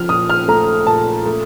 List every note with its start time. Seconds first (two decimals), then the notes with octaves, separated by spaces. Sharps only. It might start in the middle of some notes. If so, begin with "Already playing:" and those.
Already playing: F3 F6
0.09 A#2 D#6
0.30 F6
0.48 A3 A#5
0.87 A#2 A5
1.26 A3